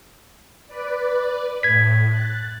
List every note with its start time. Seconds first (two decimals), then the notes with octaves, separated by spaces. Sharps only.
0.68 B4 D5
1.63 A2 G#6 B6
2.07 F#6 A6